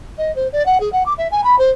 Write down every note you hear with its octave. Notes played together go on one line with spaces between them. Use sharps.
D#5
C5
D5
F#5
G#4
F#5
D6
E5
G#5
B5
C5